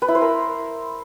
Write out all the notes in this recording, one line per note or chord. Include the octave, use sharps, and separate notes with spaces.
B4
E4
C5
A#4